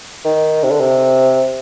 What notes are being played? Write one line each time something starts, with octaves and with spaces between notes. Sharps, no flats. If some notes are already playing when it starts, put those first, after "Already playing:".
D#3
C3
D3
C3